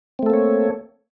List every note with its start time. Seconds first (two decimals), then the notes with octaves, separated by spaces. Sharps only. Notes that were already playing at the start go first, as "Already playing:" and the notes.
0.19 C4
0.23 A3
0.26 A4
0.30 A#3
0.33 C#5